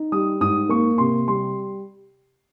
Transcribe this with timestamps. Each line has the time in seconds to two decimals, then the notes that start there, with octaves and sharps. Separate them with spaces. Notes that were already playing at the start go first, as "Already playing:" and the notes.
Already playing: D#4
0.12 G3 D#6
0.41 G#2 D#6
0.69 A#3 C#6
0.98 C3 C6
1.28 G3 C6